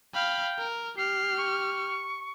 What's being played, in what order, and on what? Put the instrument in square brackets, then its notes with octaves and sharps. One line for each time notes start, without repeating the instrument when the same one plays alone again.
[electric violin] F5 B5 [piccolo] G5
[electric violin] A#4
[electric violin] G4 F6 [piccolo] C7
[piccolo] C#6